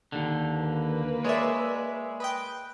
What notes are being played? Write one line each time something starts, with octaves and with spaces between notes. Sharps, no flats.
D#2 D3
A#3 B4
G#3 C#5 D5 E5
B4 D#5 G5